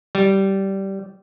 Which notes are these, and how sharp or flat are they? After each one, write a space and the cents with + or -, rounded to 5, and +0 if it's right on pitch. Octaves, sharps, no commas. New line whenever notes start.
G3 -15